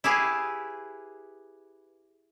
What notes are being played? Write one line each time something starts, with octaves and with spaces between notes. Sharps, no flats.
E4 G4 G#4 B4 F5